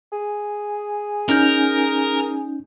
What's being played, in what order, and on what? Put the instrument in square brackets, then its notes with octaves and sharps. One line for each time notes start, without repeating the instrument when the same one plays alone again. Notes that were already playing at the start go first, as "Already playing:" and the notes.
[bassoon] G#4
[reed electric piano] C#4 D#4 G6 [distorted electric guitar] A#4